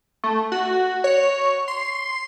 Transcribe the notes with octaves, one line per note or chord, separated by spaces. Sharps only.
A3
F#4
C#5
C6